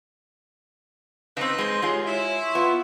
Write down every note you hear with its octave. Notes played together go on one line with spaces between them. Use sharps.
C#3 C4 D#4 B4
G#3 C5 C6
G#3 F4 G4 G#4 C#5
E4 C#5
C6 C#6
B3 F4